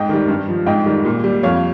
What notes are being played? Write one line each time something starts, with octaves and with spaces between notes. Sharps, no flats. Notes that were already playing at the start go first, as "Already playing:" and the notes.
Already playing: G#2 D#5 G5
D#3 G3
G2
F3
G#2 D#5 G5
D#3 G3
A#2
G3
F2 C#5 F5